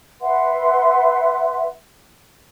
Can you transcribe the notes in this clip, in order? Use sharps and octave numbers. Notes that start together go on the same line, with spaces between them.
B4 E5 F#5 C6